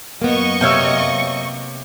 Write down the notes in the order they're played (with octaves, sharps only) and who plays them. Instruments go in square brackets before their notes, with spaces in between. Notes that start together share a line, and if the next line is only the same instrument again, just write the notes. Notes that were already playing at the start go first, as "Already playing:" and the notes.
[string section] F#2 D#5 C#6 [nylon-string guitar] A#3 B3
[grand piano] C3 E6 [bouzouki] C#5 F5 G5